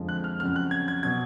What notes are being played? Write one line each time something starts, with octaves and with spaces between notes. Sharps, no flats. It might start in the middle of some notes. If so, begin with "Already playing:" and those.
Already playing: F2 D3 F3 G#3
F#6
F6
F2 C#3 F#3 F6
F#6
G#6
G#6
B2 F#3 G#6